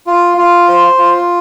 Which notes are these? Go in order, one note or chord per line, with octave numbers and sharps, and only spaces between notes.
F4
F4
C5
F4